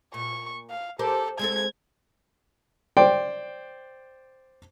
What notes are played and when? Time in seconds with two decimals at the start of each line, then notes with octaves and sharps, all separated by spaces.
0.14 A#2 C#6
0.70 F5
0.99 G4 A4 A#4 C5
1.39 G#3 C4 A4 G#6
2.97 C5 D5 G5